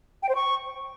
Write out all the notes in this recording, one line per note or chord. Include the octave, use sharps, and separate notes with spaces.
G5
C5
C#6